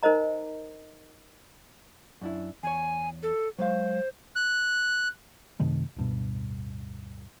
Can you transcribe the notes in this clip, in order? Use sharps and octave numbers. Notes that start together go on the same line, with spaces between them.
D#4 A#4 C5 D#5 A#5
F#2 D4 E4
E2 C#5 G#5
A4
F#3 G#3 C5 F5
F#6
F#2 C3 D#3 A3
D1 G2 B2